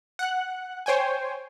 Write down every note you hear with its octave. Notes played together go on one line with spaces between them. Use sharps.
F#5 F#6
C5 C#5 G5 G#5